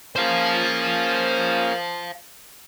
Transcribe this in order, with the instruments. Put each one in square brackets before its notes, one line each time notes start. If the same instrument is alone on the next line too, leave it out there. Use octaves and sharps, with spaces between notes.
[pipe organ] A#3 C#4 G#4 [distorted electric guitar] C5 F5